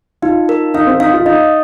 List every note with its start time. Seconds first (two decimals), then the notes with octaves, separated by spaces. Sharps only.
0.22 D#4 F4
0.49 A#4
0.74 D#4 F5
0.87 C4
1.00 D#4 F5
1.13 F4
1.25 D#4 D#5